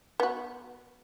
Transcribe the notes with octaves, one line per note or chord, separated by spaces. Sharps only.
B3 F#4